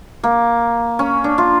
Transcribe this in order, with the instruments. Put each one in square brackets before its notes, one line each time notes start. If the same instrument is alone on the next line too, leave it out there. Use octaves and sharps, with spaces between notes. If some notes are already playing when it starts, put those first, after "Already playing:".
[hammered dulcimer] A#3
C#4
D4
F4